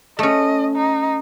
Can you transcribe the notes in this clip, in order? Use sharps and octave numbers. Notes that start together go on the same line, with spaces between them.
A3 C#4 D#5
D#4